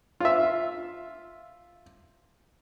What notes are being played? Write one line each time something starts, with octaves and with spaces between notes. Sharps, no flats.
F4 E5